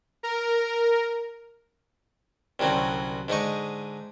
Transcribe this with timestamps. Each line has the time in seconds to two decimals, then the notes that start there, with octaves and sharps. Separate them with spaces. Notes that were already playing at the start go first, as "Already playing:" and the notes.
0.23 A#4
2.59 C2 F#2 D3 F#3 C4
3.28 G#2 D3 D#4 C#6